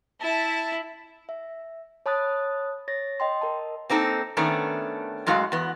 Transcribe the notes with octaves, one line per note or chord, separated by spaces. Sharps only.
E4 E5 A5
E5
C#5 A5 B5 D#6 F#6 A6
C#5 A6 A#6
D#5 G5 C6
A#4 D#5 A5
A#3 C4 D#4 A4
D#3 A3 B3 C#4 D4
F#2 A2 G#3 F#4 F5
E2 B3